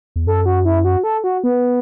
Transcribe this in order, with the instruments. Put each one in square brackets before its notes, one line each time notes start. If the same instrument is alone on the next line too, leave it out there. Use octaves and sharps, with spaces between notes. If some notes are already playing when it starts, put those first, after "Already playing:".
[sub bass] E2
[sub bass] F#2 [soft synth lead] A4
[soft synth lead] F#4
E4
F#4
A4
F#4
B3